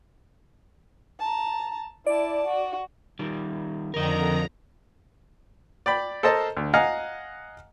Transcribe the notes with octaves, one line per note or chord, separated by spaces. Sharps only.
A5 A#5
E4 D5 A5
F#4
D#3 G3
F2 D3 A#4 D#5 A#5
D5 G5 B5
A4 A#4 C5 D#5 A5
D2
D#5 F5 F#5 G#5 A#5